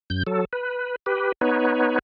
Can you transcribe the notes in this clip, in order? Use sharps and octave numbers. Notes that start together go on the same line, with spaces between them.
F#2 G6
F#3 A4
B4
G4 B4
B3 D#4 B4 C#5